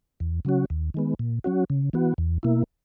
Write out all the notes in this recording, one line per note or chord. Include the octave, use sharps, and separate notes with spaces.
E2
C#3 F#3 C#4 F#4
D#2
D#3 G#3 B3
A#2
F#3 C#4 F#4
C#3
E3 B3 F#4
E2
B2 A#3 E4